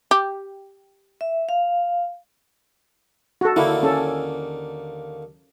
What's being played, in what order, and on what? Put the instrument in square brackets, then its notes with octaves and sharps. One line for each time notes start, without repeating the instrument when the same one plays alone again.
[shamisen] G4
[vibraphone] E5
F5
[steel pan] F#4 A4
[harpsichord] D#2 D3 A#3 [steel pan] E4
[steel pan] C#4 A4